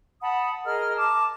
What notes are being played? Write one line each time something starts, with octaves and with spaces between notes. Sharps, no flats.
F#5 A5 B5 D#6
G#4 A#4 D#5 F6
A5 D6